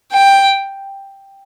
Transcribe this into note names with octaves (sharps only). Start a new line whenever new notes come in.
G5